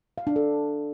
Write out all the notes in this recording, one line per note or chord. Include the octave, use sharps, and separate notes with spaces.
F5
D4
A4